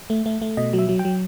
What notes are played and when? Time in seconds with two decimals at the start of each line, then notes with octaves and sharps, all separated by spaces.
0.10 A3
0.26 A3
0.42 A3
0.57 B2 D#5
0.73 F#3
0.78 E5
0.89 F#3
0.99 G5
1.05 F#3